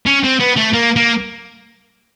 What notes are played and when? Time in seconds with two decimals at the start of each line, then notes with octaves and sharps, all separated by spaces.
0.06 C#4
0.24 C4
0.40 B3
0.56 A3
0.73 A#3
0.96 A#3